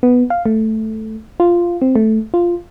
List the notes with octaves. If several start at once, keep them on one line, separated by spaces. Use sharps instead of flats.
B3
F5
A3
F4
C4
A3
F4